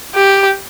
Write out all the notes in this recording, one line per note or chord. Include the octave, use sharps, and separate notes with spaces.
G4